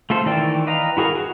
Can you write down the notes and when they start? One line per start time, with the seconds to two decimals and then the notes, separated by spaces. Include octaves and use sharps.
0.10 A3 F4 A4 C5
0.26 D#3 E3 D5 G5
0.67 B4 D#5 F5 A#5
0.97 E4 F#4 G#4 A#4 F5
1.15 F#4